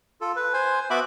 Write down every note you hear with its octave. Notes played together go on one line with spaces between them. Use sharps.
F4 A4
B4
C5 G#5
B3 F#4 E5 B5 D6